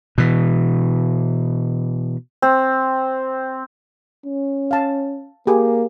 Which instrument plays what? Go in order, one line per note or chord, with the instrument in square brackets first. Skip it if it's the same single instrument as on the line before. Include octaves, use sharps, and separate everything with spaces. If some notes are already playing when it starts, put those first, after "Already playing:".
[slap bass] B2 E3
[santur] C4
[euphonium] C#4
[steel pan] F5 A5
[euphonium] A#3 [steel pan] G4 G#4